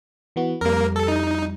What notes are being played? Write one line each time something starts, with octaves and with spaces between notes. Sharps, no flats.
E3 B3 F#4
F2 G3 A#3 A#4
A4
D#4